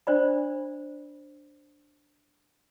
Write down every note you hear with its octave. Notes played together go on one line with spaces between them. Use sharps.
D4 C5 D5 B5